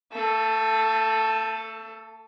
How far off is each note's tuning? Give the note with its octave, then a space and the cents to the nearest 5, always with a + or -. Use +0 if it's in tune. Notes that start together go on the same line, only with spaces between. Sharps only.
A3 +35 A4 +0